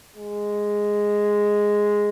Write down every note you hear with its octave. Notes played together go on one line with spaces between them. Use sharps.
G#3